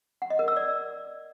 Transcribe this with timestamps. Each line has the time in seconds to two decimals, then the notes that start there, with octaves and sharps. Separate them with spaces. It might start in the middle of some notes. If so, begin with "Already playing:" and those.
0.22 F#5
0.30 D#5
0.39 A#4
0.48 E6
0.57 D5